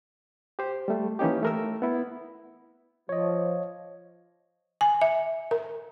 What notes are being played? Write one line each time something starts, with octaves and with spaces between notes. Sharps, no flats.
G4 C5
G3 A3
E3 A#3 C#4 D#4 G4
A3 A#4 E6
B3 E4
F3 C#5 D#5
G#5
E5
A#4